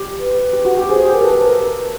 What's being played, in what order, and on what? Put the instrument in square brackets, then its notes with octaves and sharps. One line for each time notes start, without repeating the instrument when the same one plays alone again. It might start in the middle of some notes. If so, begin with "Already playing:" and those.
Already playing: [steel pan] G4
[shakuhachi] B4
[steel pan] G4
F#4
G4
[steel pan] G#4 [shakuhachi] C5
[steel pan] G4
[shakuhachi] A#4
[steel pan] A4 [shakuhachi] B4
[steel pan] A#4